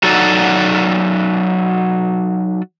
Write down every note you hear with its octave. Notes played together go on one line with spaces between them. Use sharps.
F#3 D#4 F#4 A4 D5